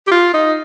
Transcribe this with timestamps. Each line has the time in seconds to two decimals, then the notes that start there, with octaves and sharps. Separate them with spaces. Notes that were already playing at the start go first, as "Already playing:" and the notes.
0.07 G4
0.11 F4
0.34 D#4